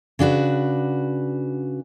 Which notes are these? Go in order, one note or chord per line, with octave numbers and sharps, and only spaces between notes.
C#3 D4 F#4 B4